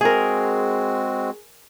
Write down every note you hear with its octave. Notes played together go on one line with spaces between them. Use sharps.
G#3 C4 F#4 G#4 A#4